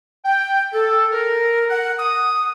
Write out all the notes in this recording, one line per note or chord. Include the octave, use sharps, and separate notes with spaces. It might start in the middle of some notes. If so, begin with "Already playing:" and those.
G5
A4
A#4
F#5
D#6